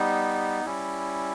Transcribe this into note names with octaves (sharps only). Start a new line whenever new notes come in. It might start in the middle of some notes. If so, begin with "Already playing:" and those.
Already playing: G3 B3 D#4
G3 C#4 E4